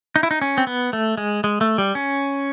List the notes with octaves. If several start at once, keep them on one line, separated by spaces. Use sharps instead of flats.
D#4
E4
D#4
C#4
C4
B3
A3
G#3
G#3
A3
G3
C#4